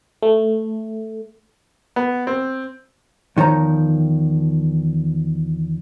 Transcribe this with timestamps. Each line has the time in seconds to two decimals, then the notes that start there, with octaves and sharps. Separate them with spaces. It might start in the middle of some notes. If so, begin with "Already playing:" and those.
0.23 A3
1.96 B3
2.27 C4
3.37 E2 D#3 F3 C#5 A#5